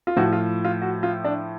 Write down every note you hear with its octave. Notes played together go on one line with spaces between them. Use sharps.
F4
A2 F3 F#4
F4
F4
F#4
F4
D4